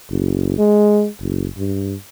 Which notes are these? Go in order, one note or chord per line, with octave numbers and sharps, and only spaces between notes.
F#1
G#3
F#1
G2